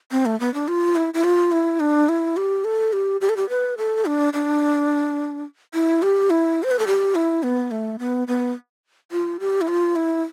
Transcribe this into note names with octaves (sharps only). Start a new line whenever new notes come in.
C4
A3
B3
D4
F4
E4
E4
F4
E4
D4
E4
G4
A4
G4
G4
A4
G4
B4
A4
D4
D4
E4
G4
E4
C5
B4
A4
G4
E4
B3
A3
B3
B3
F4
G4
E4
F4
E4